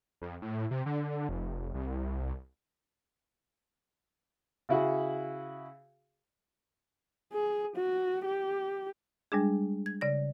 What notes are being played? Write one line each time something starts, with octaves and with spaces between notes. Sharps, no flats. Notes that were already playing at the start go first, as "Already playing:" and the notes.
F2
A2
C3
D3
F1
C2
C#3 E4 F#4 G#4
G#4
F#4
G4
G3 G#3 D4 G#4
G#6
C#3 D5 A#6